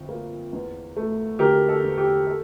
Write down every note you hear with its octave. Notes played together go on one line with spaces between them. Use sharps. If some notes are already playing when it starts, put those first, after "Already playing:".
Already playing: G1 F2
A#3
E2
A3
D3 G4 A#4
A4
E2
G4
A4